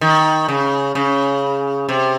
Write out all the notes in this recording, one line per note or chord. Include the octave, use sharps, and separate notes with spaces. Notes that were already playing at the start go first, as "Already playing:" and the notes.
D#3
C#3
C#3
C3